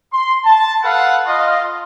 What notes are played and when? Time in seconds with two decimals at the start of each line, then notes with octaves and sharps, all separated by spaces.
0.13 C6
0.45 A5
0.84 A4 B4 F5 F#5
1.26 F4 D#5